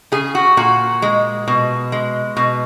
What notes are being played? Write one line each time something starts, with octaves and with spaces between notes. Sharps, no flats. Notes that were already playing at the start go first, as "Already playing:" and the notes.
C#3 G#4
F#4
A#2 F#4
G#3
B2
G#3
B2